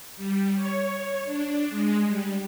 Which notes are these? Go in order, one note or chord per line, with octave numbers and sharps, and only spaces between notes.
G3
C#5
D4
G#3
G3